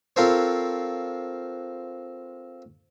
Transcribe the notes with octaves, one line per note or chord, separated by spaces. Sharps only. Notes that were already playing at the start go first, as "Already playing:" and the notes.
C4 F4 A4 A#4 C5 C#5